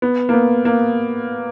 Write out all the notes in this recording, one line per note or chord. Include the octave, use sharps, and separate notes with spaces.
B3
A#3
B3
A#3